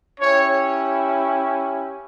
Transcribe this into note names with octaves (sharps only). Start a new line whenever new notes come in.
C#4 E4 G4 C#5